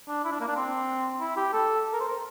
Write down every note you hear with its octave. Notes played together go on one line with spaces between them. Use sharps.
D4
E4
D4
A#3
D4
C4
E4
G4
A4
A#4
C5
A#4